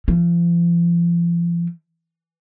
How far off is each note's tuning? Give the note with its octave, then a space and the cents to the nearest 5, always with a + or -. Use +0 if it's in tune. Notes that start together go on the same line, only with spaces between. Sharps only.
F3 -35